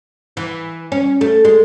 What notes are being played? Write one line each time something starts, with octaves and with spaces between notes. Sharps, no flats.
E3
C#4
A3
G#3